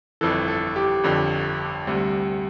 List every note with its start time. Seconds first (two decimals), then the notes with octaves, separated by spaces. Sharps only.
0.21 G1 F2 E3 A4
0.48 A4
0.76 G4
1.03 G1 F2 D3
1.87 D2 C3 G3